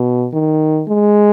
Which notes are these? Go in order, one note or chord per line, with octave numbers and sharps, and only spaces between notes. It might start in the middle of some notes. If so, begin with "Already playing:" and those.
Already playing: B2
D#3
G#3